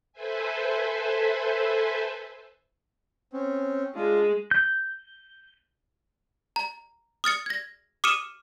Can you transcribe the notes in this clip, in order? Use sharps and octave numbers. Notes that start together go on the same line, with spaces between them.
A4 B4 C5 E5 G#5
C4 C#4
G#3 D4 F4
G6
A#5
D#6 F6 A6 C#7
G#6 A#6
D6 D#6 F6 C#7 D#7 E7